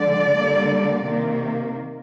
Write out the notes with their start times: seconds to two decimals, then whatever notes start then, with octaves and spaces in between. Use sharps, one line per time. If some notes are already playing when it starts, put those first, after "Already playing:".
Already playing: D3 F3 G#3 D5
0.37 D3 G3 A#3
1.05 C3 D#3 A#3